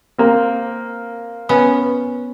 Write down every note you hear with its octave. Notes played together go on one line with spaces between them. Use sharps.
A#3 C4
B3 C#4